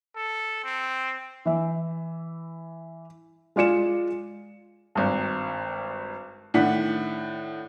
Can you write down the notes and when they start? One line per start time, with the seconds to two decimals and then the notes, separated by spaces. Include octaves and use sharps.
0.16 A4
0.64 C4
1.45 E3 E5
3.56 G#3 F4 D5 C#7 E7
4.95 G#1 G2
6.54 A2 D#3 D4 F#5 B6